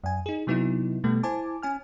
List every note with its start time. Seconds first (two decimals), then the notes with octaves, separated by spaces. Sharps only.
0.04 F#2 G#5
0.26 D#4 G#4
0.47 C3 F#3 B3 D#4 E4
1.04 B2 G3 A3 B3
1.23 E4 C5 G#5 A5 D6
1.63 C#4 G#5 F6